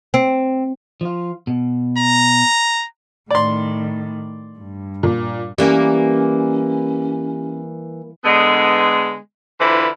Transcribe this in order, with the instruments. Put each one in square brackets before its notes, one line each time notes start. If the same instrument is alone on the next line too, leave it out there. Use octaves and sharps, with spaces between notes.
[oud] C4
[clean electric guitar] F3 F4
B2
[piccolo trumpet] A#5
[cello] A2 D#3 [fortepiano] D5 C6
[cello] G2
[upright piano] A#2
[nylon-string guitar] E3 [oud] G3 A#3 A#4 [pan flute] C#4 [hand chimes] G4
[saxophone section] D3 G#3 B3
D3 E3 E4 F4 B4 C5